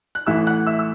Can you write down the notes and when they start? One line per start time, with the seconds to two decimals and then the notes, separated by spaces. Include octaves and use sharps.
0.15 F#6
0.27 A1 A2 E3 E5 E6
0.47 F#5 F#6
0.67 E5 E6
0.79 E6